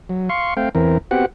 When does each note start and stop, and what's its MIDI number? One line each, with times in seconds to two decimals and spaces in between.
0.09 0.29 54
0.29 0.54 77
0.29 0.54 84
0.29 0.54 85
0.57 0.69 57
0.57 0.69 60
0.57 0.69 77
0.57 0.69 79
0.75 0.98 40
0.75 0.98 52
0.75 0.98 60
0.75 0.98 70
1.11 1.26 59
1.11 1.26 60
1.11 1.26 66
1.11 1.26 67
1.11 1.26 78